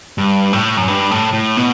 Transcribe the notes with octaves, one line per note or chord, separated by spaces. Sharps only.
G2
A2
F#2
G2
A2
A2
B2